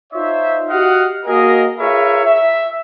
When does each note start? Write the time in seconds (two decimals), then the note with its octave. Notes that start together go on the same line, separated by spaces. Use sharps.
0.13 D#4 F4 C5 C#5 E5
0.69 F#4 G4 D#5 F5 F#5
1.26 A#3 F#4 G#4 A#4 D#5
1.79 F4 G#4 A#4 B4 C#5 E5
2.25 E5